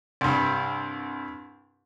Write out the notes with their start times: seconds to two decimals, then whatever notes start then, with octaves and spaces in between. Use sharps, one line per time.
0.21 C2 G2